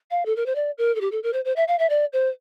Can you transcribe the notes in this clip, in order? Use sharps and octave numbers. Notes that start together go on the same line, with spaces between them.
F5
A4
A#4
C5
D5
A#4
A4
G4
A4
A#4
C5
C5
E5
F5
E5
D5
C5